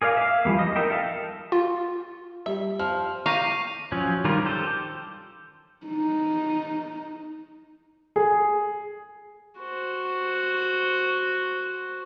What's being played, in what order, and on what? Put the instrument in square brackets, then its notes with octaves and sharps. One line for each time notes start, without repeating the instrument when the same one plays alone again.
[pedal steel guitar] G#4 A#4 D5 F5
E5 F5
E3 F3 G3 A#3
D#5
D#4 A#4 E5 G5
A4 E5 F5
[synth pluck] F4
[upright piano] G3 [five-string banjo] E5
[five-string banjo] F3 [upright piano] F6
[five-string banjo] G4 A#5 [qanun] F5 [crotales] C#6 A#6 D#7
[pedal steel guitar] F3 F#3 C#4
D#3 G3 F4 A#4
G4 A4 C5
[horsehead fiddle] D#4
[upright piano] G#4
[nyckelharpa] F#4 C5